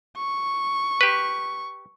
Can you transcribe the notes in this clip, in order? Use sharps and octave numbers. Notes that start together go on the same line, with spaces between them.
C#6
G4 B4